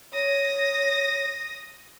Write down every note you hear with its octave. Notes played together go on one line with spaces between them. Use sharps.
C#5 D#6 A#6